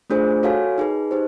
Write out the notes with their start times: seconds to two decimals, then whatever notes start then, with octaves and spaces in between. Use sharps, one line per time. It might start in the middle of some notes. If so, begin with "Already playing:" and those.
0.10 A3 D4 F4 G#4 C5
0.43 F#4 A4 C#5 F5 G#5
0.78 D#4 G#4 B4
1.11 D#4 G4 C5